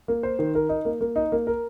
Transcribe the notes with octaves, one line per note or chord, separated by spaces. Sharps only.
A#3
C5
D#3
A#4
D#4
A#3
A#3
D#4
A#3
A#4